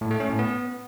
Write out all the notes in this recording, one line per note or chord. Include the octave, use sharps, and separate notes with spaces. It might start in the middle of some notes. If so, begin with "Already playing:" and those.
A2
A3
C#4
A2
B3